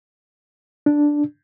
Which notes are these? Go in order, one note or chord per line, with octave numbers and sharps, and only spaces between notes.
D4